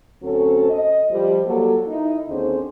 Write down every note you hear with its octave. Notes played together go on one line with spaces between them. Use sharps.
D2 F#3 C4 C#4 A4
D#5
F3 G3
F#3 G3 A#3 A4
D#4 E4
D#2 D3 C4 C#4 G#4 C5